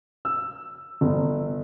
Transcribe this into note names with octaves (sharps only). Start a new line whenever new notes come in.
E6
G1